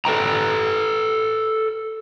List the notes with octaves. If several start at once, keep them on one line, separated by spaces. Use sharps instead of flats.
A4 B4 G5 A#5